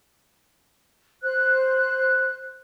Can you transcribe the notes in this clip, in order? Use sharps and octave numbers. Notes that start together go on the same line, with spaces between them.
C5 F#6